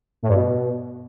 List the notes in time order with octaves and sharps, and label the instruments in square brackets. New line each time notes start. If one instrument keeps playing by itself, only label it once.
[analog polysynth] A2
G2
B2